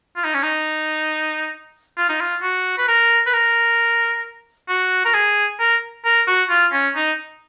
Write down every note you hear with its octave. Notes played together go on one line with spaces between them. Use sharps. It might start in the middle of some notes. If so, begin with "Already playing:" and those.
F4
D#4
C#4
D#4
F4
D#4
F4
F#4
B4
A#4
B4
A#4
F#4
A#4
G#4
A#4
A#4
F#4
F4
C#4
D#4